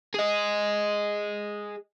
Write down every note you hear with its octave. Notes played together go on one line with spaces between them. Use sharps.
G#4 D#5